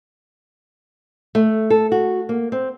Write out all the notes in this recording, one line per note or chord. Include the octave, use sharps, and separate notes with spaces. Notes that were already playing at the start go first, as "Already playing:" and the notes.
A3
A4
F#4
A#3
C4